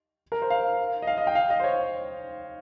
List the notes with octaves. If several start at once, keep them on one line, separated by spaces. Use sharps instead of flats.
A#4
C5
F5
D#5
F5
D#5
G5
F5
D#5
C5
C#5